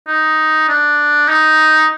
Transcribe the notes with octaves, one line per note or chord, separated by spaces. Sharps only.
D#4
D4
D#4